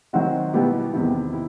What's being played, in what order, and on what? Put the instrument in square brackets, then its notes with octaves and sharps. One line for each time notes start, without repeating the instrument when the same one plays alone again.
[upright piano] D#3 F#3 C4 D#4 F#4
B2 G3 B3 E4 G4
E2 C3 D#3
E4